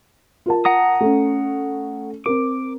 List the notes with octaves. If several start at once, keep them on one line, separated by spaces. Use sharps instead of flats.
F4 A#4 A5
F#5 A#5 D#6
A3 C#4
C4 A#4 D6